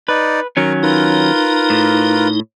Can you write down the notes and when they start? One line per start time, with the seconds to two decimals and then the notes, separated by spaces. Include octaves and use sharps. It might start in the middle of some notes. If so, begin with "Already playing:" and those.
0.08 D#4 B4 D5
0.57 D#3 F#3 C#4 A#4
0.83 D#4 F4 A#4 B4
1.70 A2